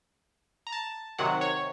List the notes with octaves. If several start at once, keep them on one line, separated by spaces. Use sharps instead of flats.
A#5
A5
C3 D#3 F#3 F#5
C#5